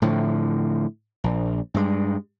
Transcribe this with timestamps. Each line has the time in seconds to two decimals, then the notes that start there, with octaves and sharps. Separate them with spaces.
0.02 A2 D3 F3
1.24 A#1
1.74 G2 G#3